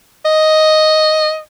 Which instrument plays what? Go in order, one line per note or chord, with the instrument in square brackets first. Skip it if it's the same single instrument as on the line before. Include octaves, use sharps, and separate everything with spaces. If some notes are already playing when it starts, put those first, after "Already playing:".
[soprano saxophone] D#5